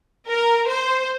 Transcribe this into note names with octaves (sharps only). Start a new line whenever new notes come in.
A#4
C5